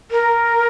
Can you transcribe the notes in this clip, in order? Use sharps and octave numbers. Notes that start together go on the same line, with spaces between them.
A#4